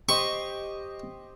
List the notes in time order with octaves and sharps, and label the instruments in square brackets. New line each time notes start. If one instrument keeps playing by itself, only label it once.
[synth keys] G4 C5 D#5 [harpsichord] C#6